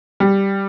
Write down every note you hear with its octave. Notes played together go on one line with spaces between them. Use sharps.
G3